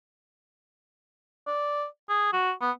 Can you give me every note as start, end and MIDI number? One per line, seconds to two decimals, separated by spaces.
1.47 1.85 74
2.09 2.33 68
2.33 2.52 66
2.62 2.71 59